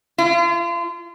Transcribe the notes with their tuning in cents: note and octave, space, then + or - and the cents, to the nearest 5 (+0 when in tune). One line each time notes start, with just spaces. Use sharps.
F4 -35